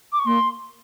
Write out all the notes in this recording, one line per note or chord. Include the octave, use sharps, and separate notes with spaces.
D6
C#6
A#3 C6